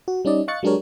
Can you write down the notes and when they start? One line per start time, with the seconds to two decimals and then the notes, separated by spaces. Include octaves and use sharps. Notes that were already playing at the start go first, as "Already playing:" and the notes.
0.08 F#4
0.25 G3 C#4 D#4 D5 D#5
0.48 D#5 F5 C#6 F#6 A6 C#7
0.63 F#3 G#3 D4 G4 A#4 C#5